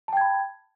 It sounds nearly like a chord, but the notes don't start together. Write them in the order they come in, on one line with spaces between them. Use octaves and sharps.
A5 G5 G#6 B5